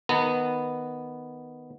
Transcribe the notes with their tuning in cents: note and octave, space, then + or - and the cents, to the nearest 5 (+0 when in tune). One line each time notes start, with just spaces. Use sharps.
D#3 +0 B3 +0 A#5 -30